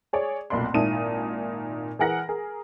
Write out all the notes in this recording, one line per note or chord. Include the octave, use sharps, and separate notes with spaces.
G#4 C#5 D5
F1 B1 A#2 D5 B5 C6
G#1 A#2 D#4 E4 A5 D#7
E3 G#4 A#4 F#5 A#6
G#4 A#4